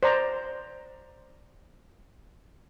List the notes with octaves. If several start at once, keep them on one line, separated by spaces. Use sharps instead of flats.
C5 D5 A#5